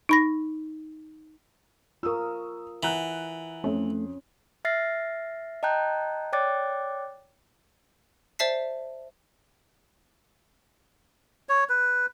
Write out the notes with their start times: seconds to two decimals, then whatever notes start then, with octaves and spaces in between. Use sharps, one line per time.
0.09 D#4 B5 A#6
2.03 F4 A#4 C#6 D#6 E6
2.83 E3 F#5 A#5 F#6
3.64 F2 A3 C#4
4.65 E5 F6 A6 A#6 C7
5.63 D#5 G5 A5 A#5 F#6 G6
6.33 C#5 D5 G5 D6 F#6 A6
8.39 C5 D5 E5 A5 B6 C7
11.49 C#5
11.69 B4